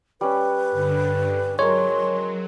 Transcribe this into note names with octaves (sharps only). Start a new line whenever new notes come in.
G3 C#4 B4
G2 D3
F#3 G#3 A#4 C#5 C6